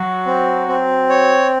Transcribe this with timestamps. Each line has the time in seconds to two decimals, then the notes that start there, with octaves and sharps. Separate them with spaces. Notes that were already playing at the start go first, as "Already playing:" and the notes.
Already playing: F#3 F#4
0.26 C4
0.68 C4
1.09 C#5